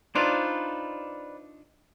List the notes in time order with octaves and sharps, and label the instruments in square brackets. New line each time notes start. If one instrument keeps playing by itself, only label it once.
[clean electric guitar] D4 D#4 F4 [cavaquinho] B4 C5 D5